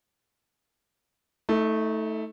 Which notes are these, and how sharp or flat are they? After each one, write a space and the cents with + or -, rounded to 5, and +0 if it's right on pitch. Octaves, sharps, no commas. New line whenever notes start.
A3 +0 D#4 +35